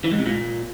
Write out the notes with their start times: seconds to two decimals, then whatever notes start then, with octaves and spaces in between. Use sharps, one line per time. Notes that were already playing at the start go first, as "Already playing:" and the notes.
0.04 E3
0.12 G#2
0.19 C3
0.26 A#2